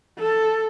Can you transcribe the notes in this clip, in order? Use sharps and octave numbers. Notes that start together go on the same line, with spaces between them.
A4